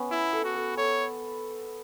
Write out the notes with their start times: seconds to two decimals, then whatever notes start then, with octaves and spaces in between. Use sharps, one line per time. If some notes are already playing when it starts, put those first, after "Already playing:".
Already playing: B3 C#4
0.11 E4
0.33 A4
0.45 F#4
0.55 A4
0.77 A4 C#5